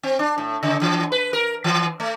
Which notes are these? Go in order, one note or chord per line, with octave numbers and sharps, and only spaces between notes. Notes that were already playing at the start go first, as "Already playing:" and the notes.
C4
D4
A2
C#3
E3
B4
A#4
E3
A3